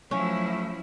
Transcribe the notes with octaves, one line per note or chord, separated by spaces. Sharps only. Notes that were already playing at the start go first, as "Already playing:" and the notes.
F3 F#3 A3 C#4 E4